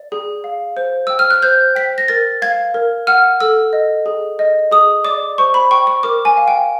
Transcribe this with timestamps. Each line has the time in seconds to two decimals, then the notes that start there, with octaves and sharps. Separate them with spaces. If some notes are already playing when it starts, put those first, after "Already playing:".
Already playing: D5
0.12 G#4
0.44 F5
0.77 C5
1.07 G5 E6
1.19 F6
1.30 F#6
1.42 C5 G6
1.75 G5 B6
1.98 A#6
2.08 A#4 A6
2.42 F5 G#6
2.74 A#4
3.07 F#5 F6
3.40 A4 E6
3.73 D#5
4.06 G#4
4.39 D#5
4.72 G#4 D#6
5.05 D5 D6
5.38 C5 C#6
5.54 B5
5.71 G5 C#6
5.87 C#6
6.03 A#4 D6
6.25 G#5
6.37 F5
6.48 G5